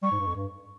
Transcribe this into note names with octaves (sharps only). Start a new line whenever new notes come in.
G3 C#6
G#2
G2
F2
G2